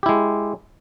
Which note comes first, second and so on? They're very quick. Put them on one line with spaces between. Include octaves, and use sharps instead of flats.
G4 E4 G#3